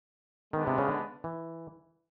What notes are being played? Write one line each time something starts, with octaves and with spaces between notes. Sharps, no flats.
D#3 G#3 B3 D4
C3
C#3
D3
E3